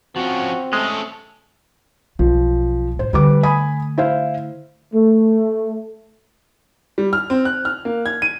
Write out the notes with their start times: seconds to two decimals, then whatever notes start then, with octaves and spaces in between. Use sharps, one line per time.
0.16 F3 C4 C#4 F#4
0.73 G#3 A3 C#4 A4
2.19 B1 F3
2.99 G#2 B2 C5
3.13 D3 G3 A3 B4 D6
3.43 G#5 B5 D#6
3.98 E4 C5 F5
4.94 A3
6.98 G3
7.13 F6
7.30 C4
7.45 F#6
7.65 F6
7.85 A#3
8.06 G#6
8.22 D#7